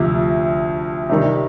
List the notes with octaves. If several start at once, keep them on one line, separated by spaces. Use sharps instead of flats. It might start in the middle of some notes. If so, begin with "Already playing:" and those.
Already playing: D2 C3 F3
C3 D#3 G3